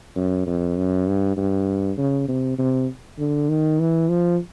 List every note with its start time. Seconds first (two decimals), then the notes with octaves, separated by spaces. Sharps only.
0.16 F#2
0.47 F2
0.77 F#2
1.07 G2
1.37 G2
1.98 C#3
2.28 C3
2.59 C3
3.19 D3
3.49 D#3
3.80 E3
4.09 F3